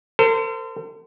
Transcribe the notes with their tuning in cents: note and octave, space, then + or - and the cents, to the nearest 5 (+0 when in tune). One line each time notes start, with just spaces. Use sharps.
A4 +45 C5 -30